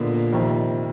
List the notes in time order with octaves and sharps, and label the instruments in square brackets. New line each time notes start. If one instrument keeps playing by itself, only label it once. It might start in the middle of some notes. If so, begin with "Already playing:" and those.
Already playing: [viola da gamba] A#2 [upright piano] D3 F3 G#3 B3
[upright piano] F2 C3 D#3